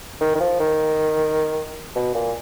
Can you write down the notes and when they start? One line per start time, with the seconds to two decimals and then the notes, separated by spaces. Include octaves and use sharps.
0.21 D#3
0.35 D#3
0.40 F3
0.60 D#3
1.95 B2
2.15 A#2